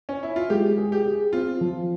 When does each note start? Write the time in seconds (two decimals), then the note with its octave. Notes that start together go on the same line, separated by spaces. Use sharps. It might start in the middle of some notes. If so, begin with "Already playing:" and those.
0.09 C#4
0.23 E4
0.36 F4
0.50 G#3 G4
0.78 G#4
0.92 G4
1.05 G#4
1.33 C4 F4
1.61 F3